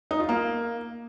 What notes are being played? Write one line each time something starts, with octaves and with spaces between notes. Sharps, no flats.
D#4
F4
A#3